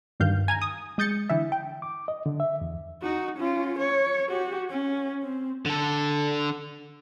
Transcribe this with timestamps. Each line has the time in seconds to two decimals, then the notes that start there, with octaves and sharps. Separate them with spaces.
0.20 D2 G2 D#3 F5 G6
0.48 G#5 A#5 G#6
0.62 D#6
0.98 G#3 D#6 G6 A6 C#7
1.30 D3 E3 E5
1.52 G5
1.82 D6
2.08 D#5
2.26 D3
2.40 E5
2.61 E2
3.02 D#4 F#4
3.38 C#4 F4
3.79 C#5
4.30 F#4 G4
4.70 C#4
5.23 C4
5.66 D3 A4